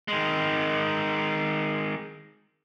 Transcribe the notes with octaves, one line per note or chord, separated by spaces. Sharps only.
D#3 G#3